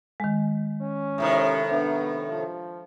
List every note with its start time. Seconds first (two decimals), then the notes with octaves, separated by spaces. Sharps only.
0.20 D#3 G#3
0.81 C#4
1.18 A2 C3 D#3
1.71 B3 D4
2.29 F3